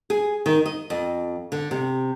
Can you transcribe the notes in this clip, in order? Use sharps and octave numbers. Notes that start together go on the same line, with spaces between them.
G#4
D#3
D#5
F2
D3
C3